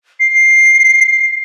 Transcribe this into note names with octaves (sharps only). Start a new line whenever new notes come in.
C7